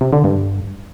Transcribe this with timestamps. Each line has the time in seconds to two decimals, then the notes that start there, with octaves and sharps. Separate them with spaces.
0.01 C3
0.13 D3
0.24 G2